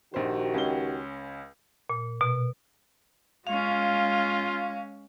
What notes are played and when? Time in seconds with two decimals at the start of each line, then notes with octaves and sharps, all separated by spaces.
0.14 A#1 D#3 F#4 G4 C5
0.54 C#2 C#4 G7
1.90 A#2
2.21 B2
3.47 G#3 C#4 F4 F5